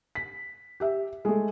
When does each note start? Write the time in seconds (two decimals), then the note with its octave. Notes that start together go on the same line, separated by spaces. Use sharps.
0.15 B6
0.80 G4 E5
1.25 G#3 A3